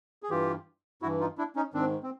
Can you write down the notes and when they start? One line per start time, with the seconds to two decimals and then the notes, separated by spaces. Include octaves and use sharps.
0.23 G#4
0.30 G2 E3 F4 G4
1.02 G2 E3 E4 F#4
1.20 D#4 F4
1.38 D4 E4
1.56 C#4 D#4
1.74 G#2 D#3 C4 D4
2.03 C4